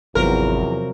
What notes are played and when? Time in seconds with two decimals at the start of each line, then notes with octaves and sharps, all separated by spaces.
0.15 G#1 E2 C3 F3 F#3 A#4